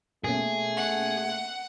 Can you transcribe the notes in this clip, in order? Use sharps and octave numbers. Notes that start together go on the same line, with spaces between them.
B2 A3 A#3 C#4 G#4
F#5